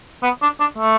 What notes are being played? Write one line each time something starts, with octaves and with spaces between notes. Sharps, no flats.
B3
D4
D4
A3